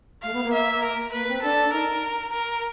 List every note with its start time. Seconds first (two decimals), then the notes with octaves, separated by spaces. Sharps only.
0.22 A3 F5
0.33 B3
0.43 A#3
0.53 E5
0.83 A#4
1.12 A#3 B4
1.28 C4
1.42 D4 A4
1.72 D#4 A#4
2.32 A#4